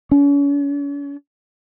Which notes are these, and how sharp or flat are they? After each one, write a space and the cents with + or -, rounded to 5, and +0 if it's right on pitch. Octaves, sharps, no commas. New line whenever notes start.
C#4 +40